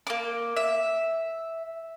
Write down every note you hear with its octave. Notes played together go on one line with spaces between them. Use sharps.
A#3 D6
E5